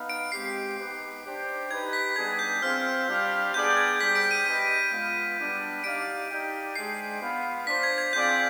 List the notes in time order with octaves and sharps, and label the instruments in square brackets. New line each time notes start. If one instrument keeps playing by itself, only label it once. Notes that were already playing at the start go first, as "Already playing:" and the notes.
Already playing: [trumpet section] B3 D#4 B4 F5
[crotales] D7
[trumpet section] G#3 C4 G4 [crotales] C7
[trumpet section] B3 D#4 G4 B4
D4 G4 C5 G5
[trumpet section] D#4 G4 B4 [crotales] G#6
[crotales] B6
[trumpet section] G3 B3 D4 G#4 [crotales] G#6
[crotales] G6
[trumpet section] C4 F4 C5 F5 [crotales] F6
[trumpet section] G3 D4 G4 C5 F5
[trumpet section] B3 D4 G#4 D5 G5 [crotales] G6
[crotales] G#6
[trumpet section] G3 D4 G#4 C5 G5 [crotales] B6
[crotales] D7
D#7
[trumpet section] D4 G4 B4 D#5 G5 [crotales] D#7
[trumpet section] G#3 B3 F4 B4 F5
G3 B3 D4
[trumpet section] D#4 G4 D5 F5 [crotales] D7
[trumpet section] D#4 G4 D5 G5
[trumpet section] G#3 D4 G#4 C5 G5 [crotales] C7
[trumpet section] B3 F4 B4 F5
[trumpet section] D4 F4 C5 [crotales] B6
[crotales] G#6
G#6
[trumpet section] C4 F4 G#4 D5 F5 [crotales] G6